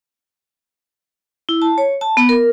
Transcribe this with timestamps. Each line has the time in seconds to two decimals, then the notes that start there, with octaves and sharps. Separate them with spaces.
1.49 E4
1.62 A5
1.78 C#5
2.01 A5
2.17 B3
2.29 A#4